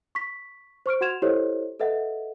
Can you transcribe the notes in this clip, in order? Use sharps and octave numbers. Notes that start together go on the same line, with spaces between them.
C#6 B6
C5 C#6 F6 D7
F#4 F#5 C6 G#6 E7 F7
E4 G4 A4 C5 C#5 D#5
A4 B4 D#5 E5 F#5